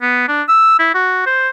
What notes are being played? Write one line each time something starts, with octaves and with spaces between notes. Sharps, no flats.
B3
D4
E6
E4
F#4
C5